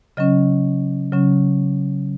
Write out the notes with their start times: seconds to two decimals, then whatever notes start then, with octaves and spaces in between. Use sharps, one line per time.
0.17 C#3 F#3 C#4 D#5
1.13 C#3 F#3 C#4